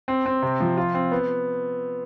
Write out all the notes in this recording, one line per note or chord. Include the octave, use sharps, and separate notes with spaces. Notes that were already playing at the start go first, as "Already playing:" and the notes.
C4
C4
C3
F3
F4
C4
B3